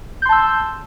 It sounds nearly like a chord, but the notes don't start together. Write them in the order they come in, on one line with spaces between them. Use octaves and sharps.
G6 C6 A5 E6